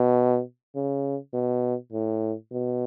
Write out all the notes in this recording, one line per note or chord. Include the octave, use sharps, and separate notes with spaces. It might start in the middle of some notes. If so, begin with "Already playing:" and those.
Already playing: B2
C#3
B2
A2
B2